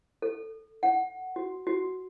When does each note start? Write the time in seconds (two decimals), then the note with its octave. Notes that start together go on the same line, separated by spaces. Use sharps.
0.22 A4
0.83 F#5
1.36 F#4
1.67 F#4